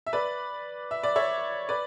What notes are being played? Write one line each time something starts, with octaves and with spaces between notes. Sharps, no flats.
E5
B4 D5
E5
D5
C#5 E5
B4 D5